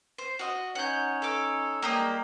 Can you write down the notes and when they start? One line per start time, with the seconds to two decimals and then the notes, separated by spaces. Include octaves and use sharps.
0.18 C5
0.39 F#4 D#5
0.75 C#4 D#4 C#5 F#5 G6
1.22 A4 D6
1.82 G3 G#3 A#3 G4 D#6